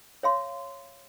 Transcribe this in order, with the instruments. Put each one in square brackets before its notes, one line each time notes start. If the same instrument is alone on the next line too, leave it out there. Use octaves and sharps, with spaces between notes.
[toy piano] C#5 F5 C6